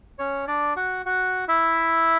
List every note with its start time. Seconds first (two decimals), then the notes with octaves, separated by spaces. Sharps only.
0.19 C#4 C#5
0.48 D4 D5
0.76 F#4 F#5
1.06 F#4 F#5
1.48 E4 E5